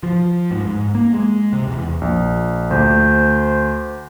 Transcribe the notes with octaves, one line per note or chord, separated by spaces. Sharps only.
F3
G#2
G#2
A#3
G#3
C3
E2
A#1
D2 C5